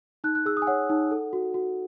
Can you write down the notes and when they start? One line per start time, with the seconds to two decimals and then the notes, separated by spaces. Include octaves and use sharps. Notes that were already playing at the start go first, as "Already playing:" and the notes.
0.24 D#4 F#6
0.35 F#6
0.46 G#4 E6
0.57 D#6
0.62 G#5
0.67 C#5 F#5
0.89 D#4
1.11 A4
1.33 F#4
1.54 F#4